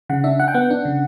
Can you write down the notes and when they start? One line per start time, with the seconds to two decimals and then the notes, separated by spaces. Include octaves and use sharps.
0.10 C#3 F#5
0.24 D4 E5
0.39 D4 F#5
0.48 G5
0.54 B3 F#5
0.70 D4
0.85 C#3